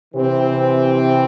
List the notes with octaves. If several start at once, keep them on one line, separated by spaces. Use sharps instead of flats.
C3 E3 C4